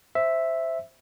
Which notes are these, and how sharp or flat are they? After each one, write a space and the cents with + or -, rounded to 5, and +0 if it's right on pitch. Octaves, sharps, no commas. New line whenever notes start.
C5 +5 E5 +0